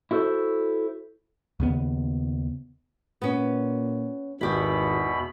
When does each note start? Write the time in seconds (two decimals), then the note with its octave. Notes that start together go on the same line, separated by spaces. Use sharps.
0.11 E4 F#4 A4 C5
1.60 D#2 C#3 B3
3.22 A#2 B3 C#4
4.41 G#1 E2 B2 E4 G4 B5